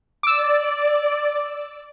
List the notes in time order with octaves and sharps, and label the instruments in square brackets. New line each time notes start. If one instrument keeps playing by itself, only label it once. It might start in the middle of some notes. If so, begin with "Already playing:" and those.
[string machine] D5 [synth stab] D6 E6